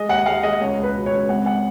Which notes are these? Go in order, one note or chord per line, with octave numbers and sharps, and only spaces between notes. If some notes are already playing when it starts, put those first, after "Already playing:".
Already playing: G#3 D#5
D#2 F#5
G#3 F5
G#3 D#5
C#2 C#5
C#2 B4
B2
C#5
C#2
G#1 F#5
F#5